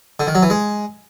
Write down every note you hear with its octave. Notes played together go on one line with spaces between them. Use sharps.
D3
D#3
F#3
E3
G#3